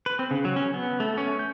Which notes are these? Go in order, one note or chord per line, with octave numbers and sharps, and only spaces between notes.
B4
C4
C#3
F#3
C#4
B3
A3
C#4
G6